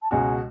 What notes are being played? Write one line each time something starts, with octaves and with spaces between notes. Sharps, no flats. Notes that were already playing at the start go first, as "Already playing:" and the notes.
A5
C#2 B2 G#3 C#4 F#4 G#5